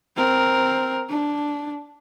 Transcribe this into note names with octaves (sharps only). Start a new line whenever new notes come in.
C4 A#4
D4